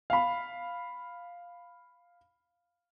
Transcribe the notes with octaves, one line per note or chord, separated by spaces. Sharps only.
F5 B5